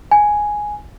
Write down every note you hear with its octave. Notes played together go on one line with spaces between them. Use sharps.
G#5